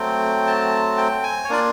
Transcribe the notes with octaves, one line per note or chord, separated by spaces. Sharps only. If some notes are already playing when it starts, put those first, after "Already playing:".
Already playing: F#3 A3 C4 G5
A5
G5
G#5
C#5
A#3 D4 F4 D5